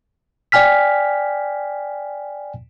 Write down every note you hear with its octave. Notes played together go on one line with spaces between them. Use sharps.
D5 G5 G#5 F6 B6